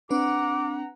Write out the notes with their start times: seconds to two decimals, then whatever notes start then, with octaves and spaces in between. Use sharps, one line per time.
0.10 C4 D4 B4 F#5 A#5 D6